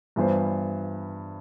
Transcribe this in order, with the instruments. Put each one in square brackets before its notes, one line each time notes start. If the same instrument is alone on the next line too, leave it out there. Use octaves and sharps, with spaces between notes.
[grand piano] G2 E3 B3 F4 C5